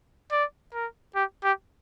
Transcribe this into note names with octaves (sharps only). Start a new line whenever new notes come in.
D5
A#4
G4
G4